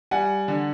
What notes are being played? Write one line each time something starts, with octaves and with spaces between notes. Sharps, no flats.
G3 F#5 G#5
D3